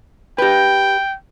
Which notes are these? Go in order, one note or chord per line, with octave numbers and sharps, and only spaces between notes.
G4 B4 G5